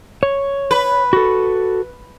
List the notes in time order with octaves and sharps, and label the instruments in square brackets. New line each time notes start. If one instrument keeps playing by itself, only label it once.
[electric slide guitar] C#5
[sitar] B4
[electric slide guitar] F#4 A4